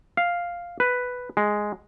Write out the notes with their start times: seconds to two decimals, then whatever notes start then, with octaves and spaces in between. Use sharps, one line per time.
0.17 F5
0.80 B4
1.37 G#3